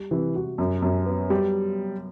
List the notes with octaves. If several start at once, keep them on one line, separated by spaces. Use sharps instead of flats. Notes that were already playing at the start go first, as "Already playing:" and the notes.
Already playing: G3
C3 E3
F#4
F#2
F#2
B3
F#3 G3